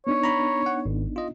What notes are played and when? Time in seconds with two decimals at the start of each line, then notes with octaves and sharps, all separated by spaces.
0.07 B3 D4 D#4 C#5
0.23 A#5 B5
0.66 F#5
0.86 G#1
1.16 F4 D#5